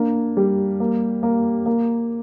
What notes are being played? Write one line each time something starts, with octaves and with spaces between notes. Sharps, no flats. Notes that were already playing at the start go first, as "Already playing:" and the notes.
Already playing: A#3 D4
G3
A#3
A#3
A#3